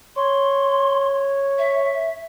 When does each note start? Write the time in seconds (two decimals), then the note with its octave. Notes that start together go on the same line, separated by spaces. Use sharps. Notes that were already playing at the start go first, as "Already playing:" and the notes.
0.16 C#5 C6
1.59 E5